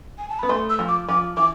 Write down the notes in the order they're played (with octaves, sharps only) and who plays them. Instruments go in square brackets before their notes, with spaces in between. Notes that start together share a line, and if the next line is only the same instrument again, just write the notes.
[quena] G#5
A5
[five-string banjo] B3 [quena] B5
[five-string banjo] A3 [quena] C6
[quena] E6
[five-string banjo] F3
[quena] D6
[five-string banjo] F3 [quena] D6
[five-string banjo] E3 [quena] D6